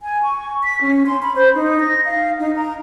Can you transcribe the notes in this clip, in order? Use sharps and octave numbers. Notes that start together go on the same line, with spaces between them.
G#5
C#6
B6
C#4
C6
B5
C5
D#4
A#6
F5
D#4
A#5